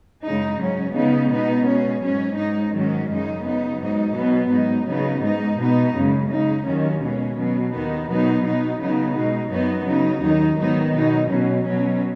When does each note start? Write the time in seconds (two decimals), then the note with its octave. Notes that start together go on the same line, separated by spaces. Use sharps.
0.23 F#2 C#3 G#3 D#4
0.59 G#2 F#3 C#4
0.95 C#3 G#3 B3 D#4
1.30 B2 B3 D#4
1.65 B2 G#3 C#4
2.02 G#2 F#3 C#4
2.37 G#2 G#3 D#4
2.73 G#2 D#3 F#3 C#4
3.08 F#2 C#3 G#3 D#4
3.44 C#3 B3 D#4
3.80 G#2 F#3 D#4
4.16 B2 F#3 B3
4.51 G#2 F#3 D#4
4.87 C#3 F#3 B3 D#4
5.23 G#2 G#3 D#4
5.59 B2 B3 D#4
5.94 F#2 C#3 G#3
6.30 C#3 G#3 D#4
6.65 D#2 D#3 F#3 C#4
7.01 B2 G#3 C#4
7.37 B2 F#3 C#4
7.73 D#2 D#3 B3 D#4
8.08 B2 F#3 B3 D#4
8.44 B2 B3 D#4
8.79 C#3 F#3 B3 D#4
9.15 B2 G#3 D#4
9.51 F#2 F#3 B3 D#4
9.86 C#3 F#3 D#4
10.22 D#2 D#3 F#3 D#4
10.57 G#2 D#3 F#3 B3 D#4
10.93 B2 F#3 D#4
11.29 B2 F#3 C#4
11.65 B2 F#3 C#4